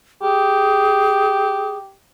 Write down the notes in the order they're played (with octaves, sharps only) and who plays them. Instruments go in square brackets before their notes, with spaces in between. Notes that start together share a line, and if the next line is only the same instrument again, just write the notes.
[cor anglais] G4 [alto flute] G#4